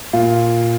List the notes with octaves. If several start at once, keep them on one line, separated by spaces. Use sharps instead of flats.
A#2 F4